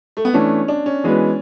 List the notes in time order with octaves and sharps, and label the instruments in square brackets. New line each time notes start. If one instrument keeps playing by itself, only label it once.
[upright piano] A3
B3
[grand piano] E3 A3 D4 [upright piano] C#4
[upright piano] D4
C#4
[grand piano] E3 G#3 B3 F#4 B4